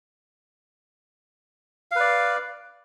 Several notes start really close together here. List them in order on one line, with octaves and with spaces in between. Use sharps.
F5 B4 D5